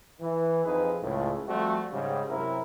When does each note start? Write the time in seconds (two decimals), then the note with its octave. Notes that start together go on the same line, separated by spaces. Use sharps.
0.21 E3
0.65 F2 D#4 G#4 B4
1.02 C#2 A2
1.48 F3 G3 A3 C4 F#4
1.91 G#2 C#3 G3
2.29 F#2 C3 E4 A#4